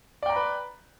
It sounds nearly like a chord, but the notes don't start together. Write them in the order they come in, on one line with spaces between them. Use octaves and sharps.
D5 G5 A#5 B5 B4